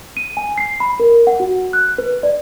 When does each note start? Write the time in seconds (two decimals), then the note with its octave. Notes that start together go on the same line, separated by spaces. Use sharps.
0.17 D#7
0.37 G#5
0.58 C7
0.80 B5
1.00 A#4
1.27 F#5
1.40 F#4
1.73 F#6
1.98 B4
2.23 D5